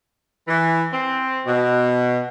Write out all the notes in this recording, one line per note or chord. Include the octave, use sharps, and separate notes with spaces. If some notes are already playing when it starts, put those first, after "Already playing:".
E3
C4
B2